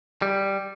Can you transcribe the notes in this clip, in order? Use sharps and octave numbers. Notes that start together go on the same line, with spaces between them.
G3